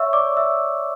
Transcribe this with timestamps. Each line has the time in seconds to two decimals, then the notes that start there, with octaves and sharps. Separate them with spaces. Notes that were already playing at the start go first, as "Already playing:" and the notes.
Already playing: C#5 E5 C#6 E6
0.13 D5 D6
0.37 E5 E6